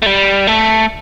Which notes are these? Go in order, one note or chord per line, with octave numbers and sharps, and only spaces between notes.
A3
G3
A3